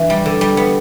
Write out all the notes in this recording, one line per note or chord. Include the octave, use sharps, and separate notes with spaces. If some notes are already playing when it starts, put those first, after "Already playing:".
Already playing: E3 D4
G3
D3
G3
B3